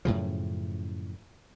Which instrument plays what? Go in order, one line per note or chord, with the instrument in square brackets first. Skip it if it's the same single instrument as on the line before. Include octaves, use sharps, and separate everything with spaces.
[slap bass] F#2 A2 C#3 F3